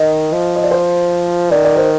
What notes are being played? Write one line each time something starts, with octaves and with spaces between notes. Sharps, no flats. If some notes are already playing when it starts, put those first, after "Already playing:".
Already playing: D#3 D#5
F3
D#5
D5
C5
D#3 D5
D5
C5